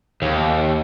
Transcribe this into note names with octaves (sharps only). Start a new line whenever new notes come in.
D#2